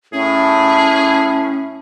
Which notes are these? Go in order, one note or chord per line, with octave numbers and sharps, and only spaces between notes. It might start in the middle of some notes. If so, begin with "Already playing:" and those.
A2 C#4 G#4